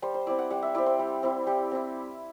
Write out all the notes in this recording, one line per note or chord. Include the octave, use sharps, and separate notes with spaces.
G3 C5
C5
C4 E4 D5
F#5
G3 F#5
E5
C4 E4 D5
C5
G3
C4 E4
G3 G4
C4 E4